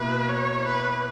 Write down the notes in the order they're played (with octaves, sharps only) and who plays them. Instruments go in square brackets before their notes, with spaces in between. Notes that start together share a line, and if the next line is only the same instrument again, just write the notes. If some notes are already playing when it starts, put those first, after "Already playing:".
Already playing: [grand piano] B2 A#3 E4 [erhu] B4
[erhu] C#5
B4